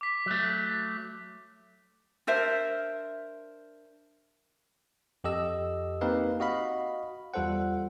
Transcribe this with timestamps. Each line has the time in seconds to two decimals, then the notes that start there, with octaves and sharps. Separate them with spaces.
0.01 D6 B6
0.26 F#3 A3
2.27 D4 A#4 C5 E5
5.24 F2 G4 A4 D#5 E6
6.01 A#3 C4 D#4 G4 B4 F5
6.40 F#4 D#5 F5 B5
7.34 E2 G3 F4 A4 C5 F#5